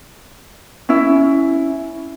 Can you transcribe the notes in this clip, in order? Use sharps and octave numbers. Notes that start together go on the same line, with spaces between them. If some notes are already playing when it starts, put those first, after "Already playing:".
C#4 E4